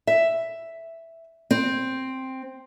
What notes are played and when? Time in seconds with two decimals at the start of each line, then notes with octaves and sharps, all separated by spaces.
0.07 E5
1.51 C4